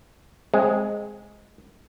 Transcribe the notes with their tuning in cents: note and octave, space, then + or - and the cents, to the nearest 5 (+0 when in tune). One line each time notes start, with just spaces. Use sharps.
G#3 +0 C4 +0